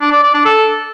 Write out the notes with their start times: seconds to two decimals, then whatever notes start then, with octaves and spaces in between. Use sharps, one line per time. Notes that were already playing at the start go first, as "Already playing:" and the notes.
0.01 D4
0.12 D5
0.23 D5
0.34 D4
0.45 A4